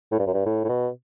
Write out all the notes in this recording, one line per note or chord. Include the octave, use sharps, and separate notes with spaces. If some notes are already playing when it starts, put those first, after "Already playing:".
A2
G2
F#2
G2
A2
A2
B2